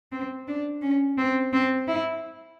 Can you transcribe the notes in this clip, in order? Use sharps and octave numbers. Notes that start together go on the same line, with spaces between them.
C4
D4
C#4
C4
C4
E4